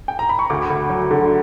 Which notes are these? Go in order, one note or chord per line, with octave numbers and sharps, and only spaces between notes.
G5
A#5
B5
C#6
D2 D6
D2
F#3
D3